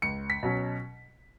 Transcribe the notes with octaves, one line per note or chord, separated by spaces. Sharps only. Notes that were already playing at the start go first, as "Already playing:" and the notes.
C#2 C#7
B6
B2 F#3 C#4